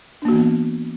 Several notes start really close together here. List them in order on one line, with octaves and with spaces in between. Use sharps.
D4 A#3 F#4 E3 B3